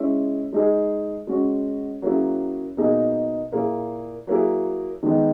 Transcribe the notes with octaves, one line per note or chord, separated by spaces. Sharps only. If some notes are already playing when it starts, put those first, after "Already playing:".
Already playing: G#3 C#4 E4
G#3 D#4 G#4
G#3 C#4 F#4
F#3 A#3 C#4 E4 G#4
B2 A#3 D#4 G#4
A#2 A#3 E4 G#4
F#3 A#3 E4 G#4
D#3 G#3 B3 D#4